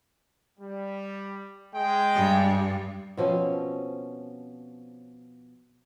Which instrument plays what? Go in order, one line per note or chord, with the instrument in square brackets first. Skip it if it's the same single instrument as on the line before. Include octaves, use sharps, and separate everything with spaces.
[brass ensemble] G3
G#3 G5
[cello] G2
[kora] B2 F3 C4 C#4